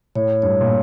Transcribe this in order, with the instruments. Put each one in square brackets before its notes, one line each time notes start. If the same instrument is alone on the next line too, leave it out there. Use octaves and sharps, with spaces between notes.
[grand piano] A2 [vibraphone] C#5
[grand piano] G2 [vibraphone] C#5
[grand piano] A#2